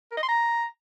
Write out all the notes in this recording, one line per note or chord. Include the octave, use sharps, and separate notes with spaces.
A#4
D#5
C6
A#5